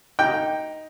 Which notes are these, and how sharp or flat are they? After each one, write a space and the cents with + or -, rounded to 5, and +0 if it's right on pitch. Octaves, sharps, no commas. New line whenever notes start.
D#4 +5 G5 +0